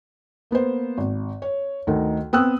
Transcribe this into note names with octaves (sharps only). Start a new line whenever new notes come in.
A#3 B3 B4 C5
G#1
C#5
D2 D#3 D#4 A4
B3 C4 G5 D#6 E6 F#6